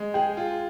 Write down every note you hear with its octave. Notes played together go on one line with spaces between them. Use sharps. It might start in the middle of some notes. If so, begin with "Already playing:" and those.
Already playing: G#3
G#4 G5
F4